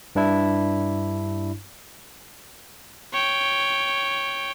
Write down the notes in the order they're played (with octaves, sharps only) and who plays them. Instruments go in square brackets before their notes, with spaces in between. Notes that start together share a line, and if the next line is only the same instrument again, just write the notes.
[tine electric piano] G2 D4 E4
[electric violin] C#5 G5